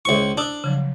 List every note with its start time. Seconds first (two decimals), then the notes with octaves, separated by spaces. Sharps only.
0.05 C#2 E4 C5 E5 C#6
0.37 D4 D#6 E6
0.64 C#3 F3 F#3